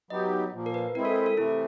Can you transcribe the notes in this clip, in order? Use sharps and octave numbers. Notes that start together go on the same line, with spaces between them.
F#3 B3 D#4 G4 D#5
A#2 F3 A#3
A#4
B4
G#3 C4 E4 A#4
A4
A4
A4
C3 E3 A3 E4